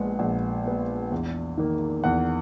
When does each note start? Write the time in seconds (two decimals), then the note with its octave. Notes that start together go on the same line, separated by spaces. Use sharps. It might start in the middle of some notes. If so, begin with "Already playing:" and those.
Already playing: A#1 A#2 G#3 B3 F#5
0.19 A#1 F#5
0.65 A#2 G#3 B3
1.12 E2
1.57 D#3 A#3
2.04 E2 F#5